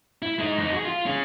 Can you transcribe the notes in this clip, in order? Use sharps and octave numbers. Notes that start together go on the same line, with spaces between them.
E4
G#3 D#4
F2 D#4
F#4 G#4
F4
C#4 G#4